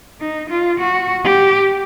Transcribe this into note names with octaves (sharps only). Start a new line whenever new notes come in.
D#4
F4
F#4
G4